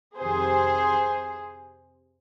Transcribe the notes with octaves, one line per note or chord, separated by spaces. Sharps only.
F2 C3 D#3 G#4 C5